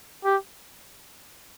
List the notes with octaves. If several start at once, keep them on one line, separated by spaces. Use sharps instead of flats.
G4